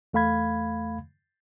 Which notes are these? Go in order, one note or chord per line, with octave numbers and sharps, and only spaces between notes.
E2 A3 F5 B5 G#6